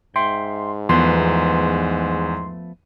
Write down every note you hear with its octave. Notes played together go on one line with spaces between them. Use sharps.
G#2 E5 G5 C6
E2 F3 A3 B3 B4 C6